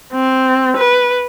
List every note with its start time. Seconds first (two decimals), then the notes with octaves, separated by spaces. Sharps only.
0.13 C4
0.77 B4